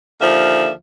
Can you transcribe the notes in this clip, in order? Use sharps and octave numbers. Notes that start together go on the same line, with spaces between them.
D#2 D3 F3 E5 F5